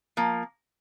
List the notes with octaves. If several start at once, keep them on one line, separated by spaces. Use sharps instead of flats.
F3 A#3